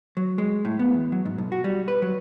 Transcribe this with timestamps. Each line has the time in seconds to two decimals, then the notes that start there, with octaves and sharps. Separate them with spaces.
0.17 F#3
0.38 G#3
0.65 A2
0.79 B3
0.94 E2
1.12 F#3
1.25 G#2
1.38 B1
1.52 F#4
1.64 G3
1.88 B4
2.02 F#3